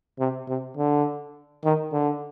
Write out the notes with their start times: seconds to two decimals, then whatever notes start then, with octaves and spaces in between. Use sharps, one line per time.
0.19 C3
0.48 C3
0.77 D3
1.64 D#3
1.92 D3